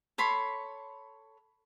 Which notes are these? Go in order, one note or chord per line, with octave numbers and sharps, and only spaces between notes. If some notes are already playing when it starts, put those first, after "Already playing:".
A4 C#5 B5 C6